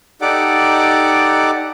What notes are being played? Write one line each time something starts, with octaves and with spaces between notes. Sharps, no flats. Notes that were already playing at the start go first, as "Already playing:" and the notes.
D#4 G4 A4 D5 F#5 D6